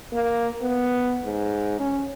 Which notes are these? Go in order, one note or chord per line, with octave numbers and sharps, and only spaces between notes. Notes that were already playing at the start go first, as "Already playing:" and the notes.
A#3
B3
G#2
C#4